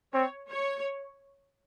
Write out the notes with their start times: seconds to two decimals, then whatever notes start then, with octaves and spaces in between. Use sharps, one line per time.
0.13 C4 C#5
0.49 C#5